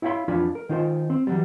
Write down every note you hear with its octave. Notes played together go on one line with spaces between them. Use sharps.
E4 C#5 F5 F#5 B5 C6
F2 E3 F3 D4 F4 B5
A#4
D#3 D#4 F4 A#4 C5
C4
E3 F#3 G3